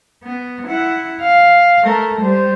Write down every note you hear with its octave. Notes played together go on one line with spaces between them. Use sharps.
B3
E4 F#5
F5
A3 A#4
G3 C5